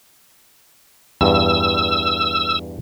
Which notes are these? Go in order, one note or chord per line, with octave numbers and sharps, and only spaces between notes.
E2 G2 E6